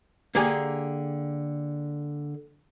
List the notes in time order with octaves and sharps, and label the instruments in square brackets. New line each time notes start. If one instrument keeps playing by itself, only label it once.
[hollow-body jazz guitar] D3 A#3 G4 G#4 G#5